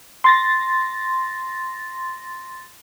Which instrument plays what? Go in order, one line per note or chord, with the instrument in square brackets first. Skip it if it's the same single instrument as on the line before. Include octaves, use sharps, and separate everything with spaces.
[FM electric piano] C6 A6 A#6